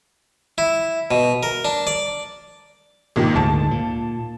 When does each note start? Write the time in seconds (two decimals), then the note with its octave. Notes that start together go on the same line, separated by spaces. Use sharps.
0.58 E4
1.11 B2
1.43 A#4
1.65 D4
1.87 D5
3.16 G#1 A#2 D#3
3.36 D2 G#2 A5
3.71 A#2